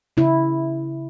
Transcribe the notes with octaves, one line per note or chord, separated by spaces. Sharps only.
C#3 E4